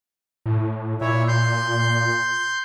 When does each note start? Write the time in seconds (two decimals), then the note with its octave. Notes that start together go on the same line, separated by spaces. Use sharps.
0.46 A2
1.01 A#2 E4 C#5 E5
1.28 C6 G6